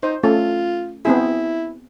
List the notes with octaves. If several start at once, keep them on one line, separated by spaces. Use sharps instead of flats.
D#4 C5
A3 C#4 F4 A4
B3 C4 E4 G#4